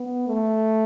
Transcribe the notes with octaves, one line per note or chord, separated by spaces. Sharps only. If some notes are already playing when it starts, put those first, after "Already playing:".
Already playing: B3
A3